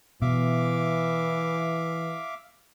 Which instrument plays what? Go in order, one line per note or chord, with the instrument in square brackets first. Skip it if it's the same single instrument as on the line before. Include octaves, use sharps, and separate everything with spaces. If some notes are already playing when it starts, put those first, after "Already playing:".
[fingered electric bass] B2 [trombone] E3 [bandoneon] E5 F5 D6